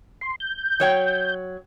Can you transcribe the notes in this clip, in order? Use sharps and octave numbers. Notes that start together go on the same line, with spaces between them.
C6
G6
F#3 C#5 G5